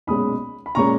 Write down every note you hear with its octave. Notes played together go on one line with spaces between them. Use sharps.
B1 A#2 G#3 C#4 B5 D#6
B5
A#2 G#3 C#4 A#5 C#6